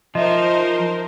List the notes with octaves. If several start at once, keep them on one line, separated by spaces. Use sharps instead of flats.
F3 D#4 A#4 C5 D#5 E5